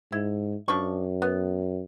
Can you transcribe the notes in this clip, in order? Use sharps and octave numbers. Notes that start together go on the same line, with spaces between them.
G#2 E4
F#2 F3 D4 C#6
B3